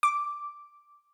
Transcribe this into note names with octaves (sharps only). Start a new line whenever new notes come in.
D6